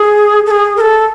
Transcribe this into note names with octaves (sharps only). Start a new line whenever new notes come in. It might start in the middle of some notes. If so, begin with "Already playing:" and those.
Already playing: G#4
A4
G#4
A#4
A4